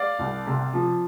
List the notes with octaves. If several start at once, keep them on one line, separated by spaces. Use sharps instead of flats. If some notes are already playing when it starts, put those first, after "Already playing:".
Already playing: D5 F5
C2
C3
F3